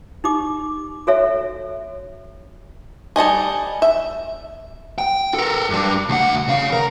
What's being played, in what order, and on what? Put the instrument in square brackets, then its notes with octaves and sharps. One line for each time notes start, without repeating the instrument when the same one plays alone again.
[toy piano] D#4 G4 D6
F#4 A4 C#5 E5
[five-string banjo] G3 A4 D#5 G#5
E5
[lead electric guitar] G5
A4 A#4
G2 G3
D2 F#5
C#3 F5
A#4